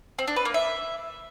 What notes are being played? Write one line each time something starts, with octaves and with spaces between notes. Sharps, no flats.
C4
D4
B4
A#3
E5